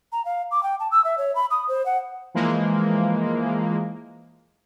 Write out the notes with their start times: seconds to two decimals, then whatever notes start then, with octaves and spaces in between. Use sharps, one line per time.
0.12 A#5
0.25 F5
0.51 D6
0.63 G5
0.80 A5
0.92 E6
1.05 E5
1.18 C#5
1.35 B5
1.51 D#6
1.69 C5
1.86 F#5
2.34 E3 F3 G#3 A#3